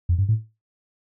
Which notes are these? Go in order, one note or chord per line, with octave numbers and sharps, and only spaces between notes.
F2
G2
A2